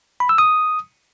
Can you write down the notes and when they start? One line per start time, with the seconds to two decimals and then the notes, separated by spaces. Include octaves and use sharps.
0.20 B5
0.29 E6
0.38 D#6